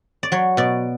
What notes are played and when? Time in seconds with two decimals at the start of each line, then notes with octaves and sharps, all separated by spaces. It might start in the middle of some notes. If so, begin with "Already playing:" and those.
0.23 D5
0.32 F#3 C#5
0.57 B2 D5